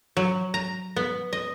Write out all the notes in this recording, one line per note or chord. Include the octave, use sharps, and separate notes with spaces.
F#3
A#5
B3
D#5